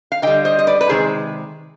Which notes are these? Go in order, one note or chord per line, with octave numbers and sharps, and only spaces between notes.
F5
D3 G3 D#5 G5
C5 D#5
D#5
B4 D5
B4
C3 D#3 G#3 G#4 C5